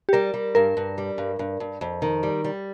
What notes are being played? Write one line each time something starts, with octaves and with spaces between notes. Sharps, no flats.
G4
G3 A#4
G3
G2 A#4
G2
G3
G2
G2
G2
F2
D#3
G3
G3